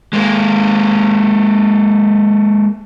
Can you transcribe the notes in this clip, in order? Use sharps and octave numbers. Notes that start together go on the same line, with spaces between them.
G#3 A#3